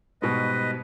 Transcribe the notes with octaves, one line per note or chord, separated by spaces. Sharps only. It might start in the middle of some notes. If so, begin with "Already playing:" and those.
G#2 B2 G3 B4 D#5